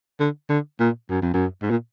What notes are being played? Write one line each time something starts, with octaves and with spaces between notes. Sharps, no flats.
D3
D3
A#2
F#2
F2
F#2
G#2
A#2